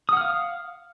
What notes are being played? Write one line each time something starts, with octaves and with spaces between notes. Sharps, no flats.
F5 F#5 D#6 F6